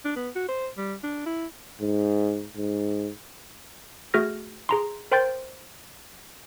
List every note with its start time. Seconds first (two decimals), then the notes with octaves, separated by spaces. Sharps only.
0.05 D4
0.16 B3
0.36 F#4
0.49 C5
0.77 G3
1.03 D4
1.26 E4
1.80 G#2
2.57 G#2
4.14 A3 F#4 G#4 F6 A#6
4.69 G#4 A#5 C6
5.12 A#4 C5 G5 C6 G6 A6